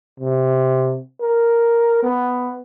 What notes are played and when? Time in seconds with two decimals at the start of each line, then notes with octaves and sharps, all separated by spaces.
0.20 C3
1.21 A#4
2.03 B3